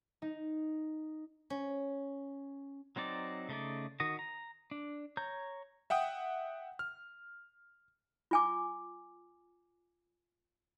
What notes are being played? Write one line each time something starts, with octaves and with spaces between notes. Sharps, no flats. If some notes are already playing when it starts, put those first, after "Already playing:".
D#4
C#4
F#3 C4 D#4 D5
C#3 A3 D#4 D5
D#3 F#4 D#5
A#5
D4
C#5 A#5 G6
E5 F#5 G5 D#6
F6
F4 G#5 D6